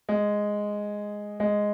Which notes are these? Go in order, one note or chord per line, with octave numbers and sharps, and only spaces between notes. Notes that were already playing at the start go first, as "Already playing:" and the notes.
G#3
G#3